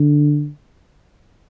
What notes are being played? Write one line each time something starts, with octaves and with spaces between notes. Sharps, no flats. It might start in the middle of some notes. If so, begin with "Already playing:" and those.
Already playing: D3